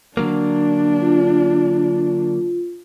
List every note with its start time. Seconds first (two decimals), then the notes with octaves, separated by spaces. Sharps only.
0.17 D3 F#3 A#3 D4
1.01 F4